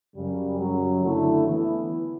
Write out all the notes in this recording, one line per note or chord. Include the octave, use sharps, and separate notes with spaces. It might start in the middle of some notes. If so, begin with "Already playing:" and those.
F#2 C#3 G3
F#2 C#3 F#3
D3 A3 E4
E3 B3 E4